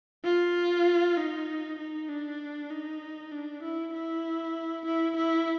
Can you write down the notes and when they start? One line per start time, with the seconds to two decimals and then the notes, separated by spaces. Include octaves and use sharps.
0.25 F4
1.17 D#4
1.79 D#4
2.09 D4
2.70 D#4
3.32 D4
3.62 E4
3.93 E4
4.85 E4
5.16 E4